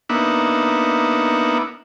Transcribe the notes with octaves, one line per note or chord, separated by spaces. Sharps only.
A#3 B3 D4 D#4 E5 F#5